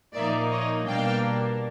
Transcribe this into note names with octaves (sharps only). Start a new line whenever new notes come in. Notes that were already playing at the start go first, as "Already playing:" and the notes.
A#2 F3 A#3 D#4 D5 E5
C#5 D#5
B2 G3 A#3 D4 F5 G5